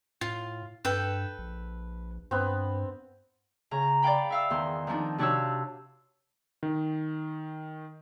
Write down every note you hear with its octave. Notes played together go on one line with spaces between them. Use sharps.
A2 F4
G2 A4 B4 G5
A#1
G2 B3 C4
C#3 A#5
D5 F5 G5 B5
E5 F5 E6
E2 D#3 C6
D#3 F3 C4 D4 D#4
C3 D4 F#4 C#5 F5 E6
D#3